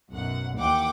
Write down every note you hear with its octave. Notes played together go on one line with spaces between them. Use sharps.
B1 F#2 F#5
D#2 E3 F#5 G5 D6